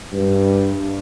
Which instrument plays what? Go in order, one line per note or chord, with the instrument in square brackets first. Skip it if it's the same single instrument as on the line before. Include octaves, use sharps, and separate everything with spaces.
[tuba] G2